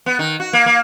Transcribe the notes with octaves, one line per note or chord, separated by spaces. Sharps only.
B3
D#3
F#4
A#3
A#3